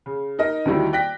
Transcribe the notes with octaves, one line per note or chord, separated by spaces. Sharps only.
C#3
D#4 A#4 D#5
D2 D#3 G3 E4 F#4
D5 G5 F#6 A#6 B6